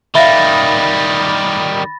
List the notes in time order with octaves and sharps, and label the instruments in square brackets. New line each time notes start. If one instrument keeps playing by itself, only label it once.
[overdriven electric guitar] D#3 G3 [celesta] E5 F5 [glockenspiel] B5 A6 A#6